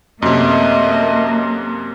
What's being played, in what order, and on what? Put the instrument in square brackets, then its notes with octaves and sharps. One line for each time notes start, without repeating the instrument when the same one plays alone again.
[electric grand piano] F#2 C3 [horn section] A3 D#5 [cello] A#3